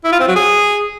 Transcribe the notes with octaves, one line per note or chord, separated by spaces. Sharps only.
E4
F4
C4
F#3
G#4